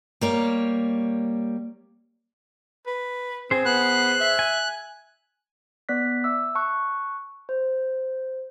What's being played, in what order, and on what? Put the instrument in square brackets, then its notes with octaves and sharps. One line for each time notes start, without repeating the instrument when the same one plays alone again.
[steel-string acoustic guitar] G3 A#3 C#5
[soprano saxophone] B4
[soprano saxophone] C4 [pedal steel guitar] G#4 C5
[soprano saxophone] B3 [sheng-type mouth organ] F#6
[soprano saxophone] E5
[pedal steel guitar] G#5
[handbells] B3 D5 F#6 B6
E5 D6 E6
A5 C#6 F#6
C5